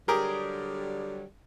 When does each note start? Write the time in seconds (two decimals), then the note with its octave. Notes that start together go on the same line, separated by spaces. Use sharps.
0.08 D3 F#3 G3 G4 G#4 A#4